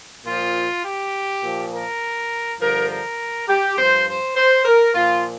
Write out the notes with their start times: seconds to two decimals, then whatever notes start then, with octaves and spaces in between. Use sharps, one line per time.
0.25 A#2 F3 F4
0.84 G4
1.42 A#2 F3
1.72 A#4
2.60 G2 D3 F3 A#4
2.89 A#4
3.48 G4
3.77 G2 F3 C5
4.07 C5
4.36 C5
4.65 A#4
4.95 A#2 F3 F4